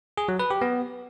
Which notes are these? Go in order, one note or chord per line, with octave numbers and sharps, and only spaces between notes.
G#4
F#3
B4
G4
B3